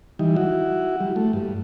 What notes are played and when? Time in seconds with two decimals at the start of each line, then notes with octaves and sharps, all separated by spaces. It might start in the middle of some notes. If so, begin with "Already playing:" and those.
0.19 E3 G3 D#4
0.36 E4 F#4
1.00 G3
1.16 A3
1.33 G2